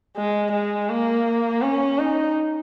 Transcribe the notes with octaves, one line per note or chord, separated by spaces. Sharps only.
G#3
G#3
A#3
C#4
D#4